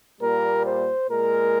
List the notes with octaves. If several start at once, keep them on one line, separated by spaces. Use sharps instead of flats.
A#2 G3 A#3 A#4
C5
A#2 G#3 A#4